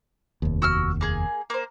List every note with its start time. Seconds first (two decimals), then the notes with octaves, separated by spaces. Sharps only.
0.42 F1 D#2
0.62 F#4 E6 F6
1.01 A#3 G#4
1.50 A#3 C5